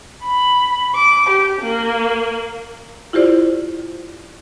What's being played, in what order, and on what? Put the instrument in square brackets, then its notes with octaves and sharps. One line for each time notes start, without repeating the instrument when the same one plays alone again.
[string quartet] B5
D6
G4
A#3
[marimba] E4 F4 G4 C5 D5